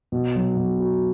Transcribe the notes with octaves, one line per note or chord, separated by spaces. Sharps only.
B2
F#3
B2
F#4